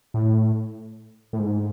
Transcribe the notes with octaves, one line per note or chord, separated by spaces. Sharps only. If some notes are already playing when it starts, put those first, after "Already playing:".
A2
A2
G#2